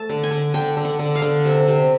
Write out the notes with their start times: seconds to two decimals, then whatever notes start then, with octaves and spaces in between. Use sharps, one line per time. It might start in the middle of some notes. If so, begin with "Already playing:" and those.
Already playing: A3 A5
0.09 D3
0.23 G#5
0.31 D3
0.54 D3 G5
0.77 D3
0.85 F#5
0.99 D3
1.15 F5
1.22 D3
1.45 C3
1.68 C3